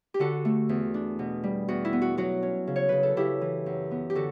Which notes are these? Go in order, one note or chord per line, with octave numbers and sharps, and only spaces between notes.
G4
D3 F#4 A4
A3
E2
D4
B2
G3
E2 F#4
E4
B3
F#4
F#3 F#4
C#4
C#3
C#5
C#3 B4
A4
C#3 E4 G4
E3
F#2
B3
G4
D3 F#4 A4